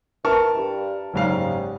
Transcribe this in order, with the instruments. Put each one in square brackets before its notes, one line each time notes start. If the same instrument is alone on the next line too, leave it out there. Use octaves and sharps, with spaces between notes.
[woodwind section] E3 [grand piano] A#4 A5 C#6
[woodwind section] G2
[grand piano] F#1 G#2 F5 [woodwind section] G3 C#4